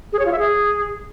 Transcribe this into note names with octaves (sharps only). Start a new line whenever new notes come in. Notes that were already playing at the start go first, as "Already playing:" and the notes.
G#4
C#5
F4
E5
G#4